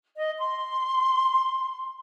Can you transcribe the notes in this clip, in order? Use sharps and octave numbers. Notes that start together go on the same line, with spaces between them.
D#5
C6